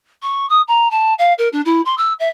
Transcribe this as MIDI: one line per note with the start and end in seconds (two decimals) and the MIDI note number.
0.22 0.48 85
0.49 0.62 87
0.68 0.90 82
0.91 1.14 81
1.19 1.33 77
1.38 1.49 70
1.53 1.61 62
1.65 1.81 64
1.85 1.95 84
1.98 2.14 88
2.20 2.29 76